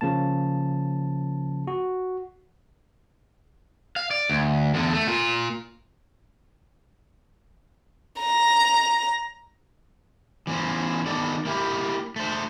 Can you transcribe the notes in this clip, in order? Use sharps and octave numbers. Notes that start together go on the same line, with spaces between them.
C#3 F3 A#3 A5
F#4
F5
D5
D2
E2 D3
A3
A#2 F4
A#5
E3 B3 C#4 C5
D#3 B3 A4 D5
A#3 E4 G4
A3 C5